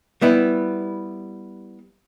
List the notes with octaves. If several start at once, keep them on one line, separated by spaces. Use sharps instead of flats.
G3 B3 E4